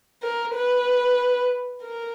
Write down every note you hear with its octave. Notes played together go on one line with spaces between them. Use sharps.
A#4
B4
A#4